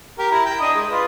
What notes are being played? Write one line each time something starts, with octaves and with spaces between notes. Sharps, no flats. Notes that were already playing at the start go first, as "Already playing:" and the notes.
G4 A#4
E4 A#5
G5
D4 D#5 D#6
G#3
F4 B4